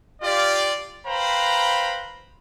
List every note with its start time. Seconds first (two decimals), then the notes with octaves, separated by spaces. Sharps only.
0.22 F4 G4 D5
1.06 B4 C5 F5 G5 A#5 B5